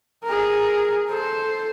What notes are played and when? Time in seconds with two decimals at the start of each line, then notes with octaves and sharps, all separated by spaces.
0.24 G#4 A#4
1.08 A4 C5